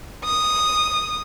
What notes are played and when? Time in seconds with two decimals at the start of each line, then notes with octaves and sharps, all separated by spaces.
0.25 D#6